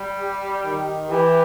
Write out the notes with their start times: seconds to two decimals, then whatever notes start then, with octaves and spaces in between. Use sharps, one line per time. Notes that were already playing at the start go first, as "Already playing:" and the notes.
Already playing: G3
0.20 G4
0.64 D#3
1.10 E3 G4